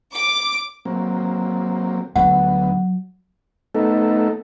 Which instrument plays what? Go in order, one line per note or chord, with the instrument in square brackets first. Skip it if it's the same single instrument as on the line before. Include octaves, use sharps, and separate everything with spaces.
[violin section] D6
[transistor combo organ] F#3 A#3 C4
[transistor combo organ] D2 B3 [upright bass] F#3 [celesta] F#5
[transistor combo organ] A3 B3 D#4 A4